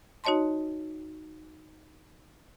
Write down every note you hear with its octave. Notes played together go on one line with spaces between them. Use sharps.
D#4 F#4 C#5 D#5 A5 C6